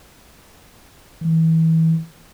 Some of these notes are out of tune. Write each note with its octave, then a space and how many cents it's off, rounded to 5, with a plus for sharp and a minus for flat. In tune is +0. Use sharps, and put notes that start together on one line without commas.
E3 -30